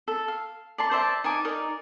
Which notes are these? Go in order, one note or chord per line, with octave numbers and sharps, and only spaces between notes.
A4
F5
D5 A5 C6
C5 D5 E5 A5
D#4 G#5 A5 D6
D#4 A#4 D5